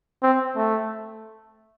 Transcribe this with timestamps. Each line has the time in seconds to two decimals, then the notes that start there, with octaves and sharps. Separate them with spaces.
0.23 C4
0.56 A3